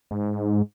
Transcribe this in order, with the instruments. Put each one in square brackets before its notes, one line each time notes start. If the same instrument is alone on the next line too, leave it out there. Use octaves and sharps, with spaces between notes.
[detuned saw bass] G#2